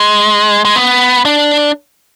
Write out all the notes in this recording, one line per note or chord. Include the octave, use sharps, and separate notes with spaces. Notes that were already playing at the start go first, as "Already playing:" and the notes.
Already playing: G#3
G#3
B3
D4